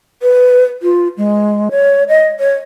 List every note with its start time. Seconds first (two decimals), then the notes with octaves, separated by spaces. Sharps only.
0.22 B4
0.83 F4
1.17 G#3
1.71 C#5
2.09 D#5
2.40 C#5